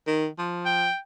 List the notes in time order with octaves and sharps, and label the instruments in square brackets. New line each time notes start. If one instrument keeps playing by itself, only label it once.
[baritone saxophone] D#3
F3
[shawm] G5